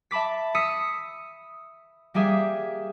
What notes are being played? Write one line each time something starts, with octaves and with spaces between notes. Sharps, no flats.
E5 A5 B5 D6 B6
D#6 E6 B6 C#7 D#7
G3 A#3 G4 G#4 E5